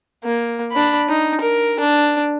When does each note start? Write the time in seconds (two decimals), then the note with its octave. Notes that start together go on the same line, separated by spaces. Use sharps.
0.24 A#3
0.72 D4 B5
1.08 D#4
1.41 A#4
1.79 D4